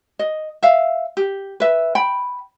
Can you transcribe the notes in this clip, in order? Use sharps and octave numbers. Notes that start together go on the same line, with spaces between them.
D#5
E5 F5
G4
B4 E5
G5 B5